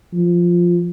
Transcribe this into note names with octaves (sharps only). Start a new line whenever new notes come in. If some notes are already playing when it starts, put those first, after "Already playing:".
F3